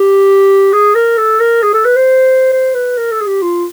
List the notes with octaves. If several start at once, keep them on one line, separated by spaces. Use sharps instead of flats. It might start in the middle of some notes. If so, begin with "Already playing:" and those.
Already playing: G4
G#4
A#4
A4
A#4
G#4
A4
B4
C5
C5
B4
A#4
A4
G#4
G4
F4